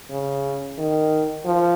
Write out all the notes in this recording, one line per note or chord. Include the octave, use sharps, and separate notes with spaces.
C#3
D#3
F3